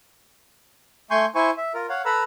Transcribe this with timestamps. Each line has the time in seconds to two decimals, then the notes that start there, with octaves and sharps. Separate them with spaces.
1.11 A3 G#5 C6 C#6 G6
1.35 E4 C5 G#5 C#6
1.58 E5
1.74 F4 A#4
1.89 C#5 F5 F#5
2.05 A4 B4 A#5 B5 E6